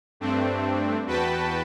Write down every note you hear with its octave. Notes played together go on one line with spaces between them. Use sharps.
G2 A3 C4 D4
E2 F#4 B4 G5 A5 B5